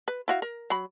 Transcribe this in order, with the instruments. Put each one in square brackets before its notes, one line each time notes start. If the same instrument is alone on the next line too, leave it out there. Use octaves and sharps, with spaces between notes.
[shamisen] B4
E4 F#4 F5
A#4
F#3 B5